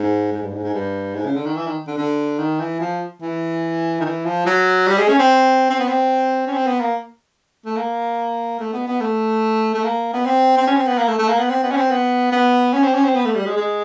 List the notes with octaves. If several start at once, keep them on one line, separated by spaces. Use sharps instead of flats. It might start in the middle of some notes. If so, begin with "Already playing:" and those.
Already playing: G#2
G#2
G2
G#2
G#2
G2
G#2
C#3
D3
D#3
E3
D#3
D3
D3
D#3
E3
F3
E3
D#3
E3
F3
F#3
G3
G#3
C#4
C4
C4
B3
C4
C#4
C4
B3
A#3
A3
A#3
A3
B3
B3
A3
A3
A#3
B3
C4
C4
C#4
C4
B3
A#3
A3
A3
A#3
B3
C4
B3
C#4
C4
B3
B3
C#4
C4
C#4
C4
B3
A3
G3
G#3
G#3